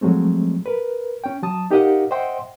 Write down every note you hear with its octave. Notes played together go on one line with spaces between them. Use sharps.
F3 F#3 G#3 A3 C4
A#4 B4
C#4 G5
F#3 A5 D#6
D#4 G4 A#4 D#5 F5 F#5
C5 D#5 E5 F#5 G5 C6